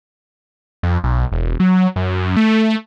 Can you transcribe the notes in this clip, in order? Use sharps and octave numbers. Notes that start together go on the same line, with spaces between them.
F2
B1
E1
F#3
F#2
A3